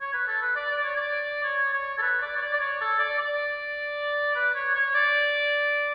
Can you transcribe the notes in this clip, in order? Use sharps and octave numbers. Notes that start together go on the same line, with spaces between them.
C#5
B4
A4
B4
D5
D5
C#5
D5
C#5
C#5
A4
B4
D5
C#5
D5
D5
C#5
A4
D5
D5
B4
C#5
C#5
C#5
D5